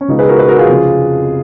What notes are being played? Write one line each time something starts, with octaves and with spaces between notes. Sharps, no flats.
C#4
C#2 B2 G#3 B3 D#4
G#4 B4
F#4 A#4
G#4 B4
F#4 A#4
F4 G#4
F1 F2 C#3